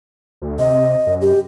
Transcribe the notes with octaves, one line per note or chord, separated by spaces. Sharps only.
D2
C3 D#5
F#2
G4